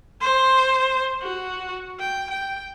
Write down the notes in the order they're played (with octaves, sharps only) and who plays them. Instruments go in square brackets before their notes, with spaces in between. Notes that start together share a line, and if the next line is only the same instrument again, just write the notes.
[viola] C5
F#4
G5
G5